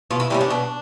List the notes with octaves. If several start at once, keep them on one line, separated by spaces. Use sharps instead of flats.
B2 F4
E4
G3 A#3 C#4 E4
D4
B2